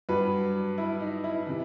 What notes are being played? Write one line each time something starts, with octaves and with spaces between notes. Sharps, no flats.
G2 F#3 B4
E4
D#4
E4
C3 E3